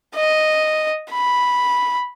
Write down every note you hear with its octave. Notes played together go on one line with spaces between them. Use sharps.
D#5
B5